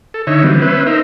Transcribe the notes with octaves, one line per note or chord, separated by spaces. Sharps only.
A4
D3 D#4 C#5 E5
D3 E3 F#3 G3 B3 C4
B3 C#4 B4 C5 E5
D#4 A#4 C5 E5